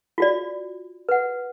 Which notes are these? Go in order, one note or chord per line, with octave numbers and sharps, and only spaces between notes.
F4 F#4 D5
B4 F#5